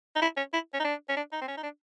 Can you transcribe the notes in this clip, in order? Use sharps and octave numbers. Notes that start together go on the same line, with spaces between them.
D#4
E4
C#4
E4
C#4
D#4
D4
C#4
D4
D#4
C4
C#4
D#4
D4